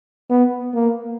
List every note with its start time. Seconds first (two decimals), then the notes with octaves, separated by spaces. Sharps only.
0.30 B3
0.74 A#3